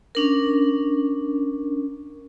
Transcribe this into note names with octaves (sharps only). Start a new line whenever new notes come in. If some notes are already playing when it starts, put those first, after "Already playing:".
C#4 D4 A#4